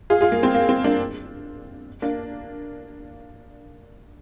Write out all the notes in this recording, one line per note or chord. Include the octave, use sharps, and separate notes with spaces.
F4 G#4
F4 G#4
A#3
C4
A#3
C4
A#3 D4
A#3 D4